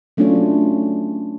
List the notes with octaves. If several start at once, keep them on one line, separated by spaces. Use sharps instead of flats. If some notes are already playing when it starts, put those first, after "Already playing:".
F#3 A3 C#4 D4 F4 C#5